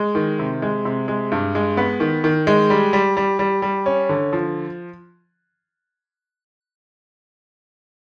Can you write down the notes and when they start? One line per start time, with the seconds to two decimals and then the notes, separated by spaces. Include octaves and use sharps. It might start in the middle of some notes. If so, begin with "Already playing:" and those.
Already playing: G#3
0.15 D#3
0.39 C3
0.62 G#3
0.85 C3
1.08 G#3
1.32 G2
1.55 G#3
1.77 B3
2.00 D#3
2.24 D#3
2.47 G#3
2.70 G3
2.93 G3
3.17 G3
3.39 G3
3.62 G3
3.86 C#4
4.09 D3
4.33 F3